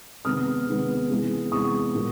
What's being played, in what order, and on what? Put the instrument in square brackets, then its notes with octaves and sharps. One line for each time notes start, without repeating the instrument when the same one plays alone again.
[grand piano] C3 D#3 G#3 B3 D#6 F6
C3 D#3 G#3 B3
C3 E3 G#3 B3
C3 E3 G#3 B3 C#6 D#6
A#2 F3 A#3